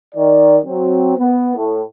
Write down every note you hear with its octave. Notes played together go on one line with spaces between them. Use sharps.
D#3 D5
F#3 C4
B3
A2